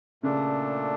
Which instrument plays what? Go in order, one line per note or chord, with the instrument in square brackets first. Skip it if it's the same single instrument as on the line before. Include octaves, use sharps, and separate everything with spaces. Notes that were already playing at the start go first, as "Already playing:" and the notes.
[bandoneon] A#2 A3 D4 [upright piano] C#3